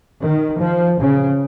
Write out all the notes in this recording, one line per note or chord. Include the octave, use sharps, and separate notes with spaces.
D#3
F3
C#3